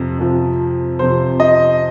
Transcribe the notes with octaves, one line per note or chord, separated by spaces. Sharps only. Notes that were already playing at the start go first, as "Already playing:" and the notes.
Already playing: F2 C3 F3
F2 C3 F3
F2 C3 F3 C5
D#5